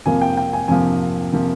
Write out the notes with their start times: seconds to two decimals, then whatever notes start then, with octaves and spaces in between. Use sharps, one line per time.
0.06 F2 C3 F3 A#3 G#5
0.22 G5
0.37 G5
0.53 G#5
0.68 F2 C3 F3 A#3 G#5
1.32 C3 F3 A#3